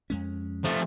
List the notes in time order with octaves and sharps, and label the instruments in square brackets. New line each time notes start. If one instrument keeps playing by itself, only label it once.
[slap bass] F2 G#3 C#4
[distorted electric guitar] F3 A3